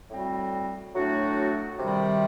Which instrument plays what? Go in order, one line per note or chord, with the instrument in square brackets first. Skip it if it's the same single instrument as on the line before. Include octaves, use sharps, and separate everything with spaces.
[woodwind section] A2 G3 C4 F#4
A2 F#3 A3 D4 F#4
C3 D#3 G3